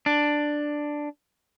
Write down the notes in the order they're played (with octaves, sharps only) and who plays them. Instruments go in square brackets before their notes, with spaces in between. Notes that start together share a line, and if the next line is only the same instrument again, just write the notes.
[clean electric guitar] D4